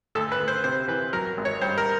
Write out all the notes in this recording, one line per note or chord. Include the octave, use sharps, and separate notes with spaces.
D2 A4
B4
D2
C5
C3 C5
E3 B4
F#3 A#4
G#1
C#5
G2 C5
A#4